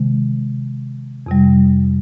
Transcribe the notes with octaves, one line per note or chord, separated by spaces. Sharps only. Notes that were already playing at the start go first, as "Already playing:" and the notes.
Already playing: C3 D#3 G#3
F2 C3 G3